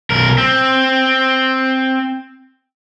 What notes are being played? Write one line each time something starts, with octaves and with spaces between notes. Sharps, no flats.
B1 A#4
C4